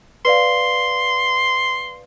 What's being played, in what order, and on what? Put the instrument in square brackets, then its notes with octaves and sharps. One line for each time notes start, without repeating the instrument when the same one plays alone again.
[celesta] B4 D5 F5 [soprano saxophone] C6